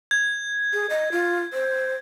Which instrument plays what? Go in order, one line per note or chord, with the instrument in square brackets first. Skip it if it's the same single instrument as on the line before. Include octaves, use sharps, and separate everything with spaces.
[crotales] G#6
[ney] G#4
D#5
F4
C5